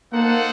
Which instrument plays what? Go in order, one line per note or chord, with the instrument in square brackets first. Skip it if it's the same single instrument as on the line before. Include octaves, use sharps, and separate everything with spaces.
[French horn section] A#3 [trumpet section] D#4 A4 C5 F#5